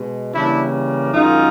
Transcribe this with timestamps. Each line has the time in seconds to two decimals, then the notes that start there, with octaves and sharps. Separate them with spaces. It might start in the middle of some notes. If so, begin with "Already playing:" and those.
Already playing: B2 G#3
0.33 C#3 E3 G3 A#3 D4 E4
1.13 F#2 D#3 G#3 D#4 F4